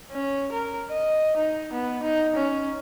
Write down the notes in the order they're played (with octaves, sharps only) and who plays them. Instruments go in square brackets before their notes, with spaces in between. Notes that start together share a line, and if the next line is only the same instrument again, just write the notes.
[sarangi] C#4
A#4
D#5
D#4
B3
D#4
C#4